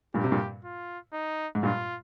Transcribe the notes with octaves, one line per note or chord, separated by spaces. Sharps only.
G2 A#2 G4
C3
G2 A#2
F4
D#4
G#2
G2 A#2 F4